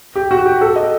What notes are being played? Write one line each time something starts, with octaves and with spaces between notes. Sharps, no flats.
G4
F#4
G4
A4
D#5